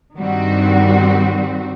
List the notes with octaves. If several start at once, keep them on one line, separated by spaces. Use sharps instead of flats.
G2 D#3 G3 C4 F#4